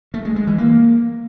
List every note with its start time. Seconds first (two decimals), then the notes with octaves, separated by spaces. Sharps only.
0.14 A3
0.25 G#3
0.36 G#3
0.47 E3
0.58 A#3